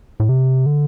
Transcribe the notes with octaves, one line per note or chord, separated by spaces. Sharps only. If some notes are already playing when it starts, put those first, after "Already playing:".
A2
C3
D3